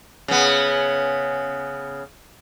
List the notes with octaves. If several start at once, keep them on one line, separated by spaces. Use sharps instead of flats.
C#3 B3